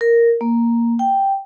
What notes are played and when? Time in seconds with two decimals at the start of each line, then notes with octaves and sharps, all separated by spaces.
0.01 A#4
0.41 A#3
0.99 G5